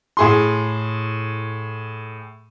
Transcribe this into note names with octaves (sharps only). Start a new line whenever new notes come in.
A2 G#4 C6